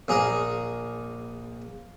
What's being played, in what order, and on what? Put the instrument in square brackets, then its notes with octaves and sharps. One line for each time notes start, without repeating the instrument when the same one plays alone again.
[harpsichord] A#1 G#4 A#4